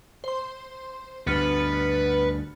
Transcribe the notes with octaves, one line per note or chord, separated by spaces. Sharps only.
C5 C6
D2 G2 B3 B4 F6 A6 C#7